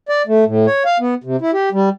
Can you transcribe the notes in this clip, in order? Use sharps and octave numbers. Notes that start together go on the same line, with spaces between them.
D5
A3
A2
C#5
F5
B3
C3
E4
G4
G3